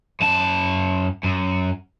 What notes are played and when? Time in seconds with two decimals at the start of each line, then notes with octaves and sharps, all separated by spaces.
0.21 F#2 A5
1.23 F#2